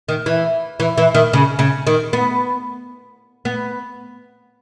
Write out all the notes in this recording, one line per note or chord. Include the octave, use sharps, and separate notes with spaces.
D#3
E3
E3
E3
D#3
C#3
C#3
D#3
B3
B3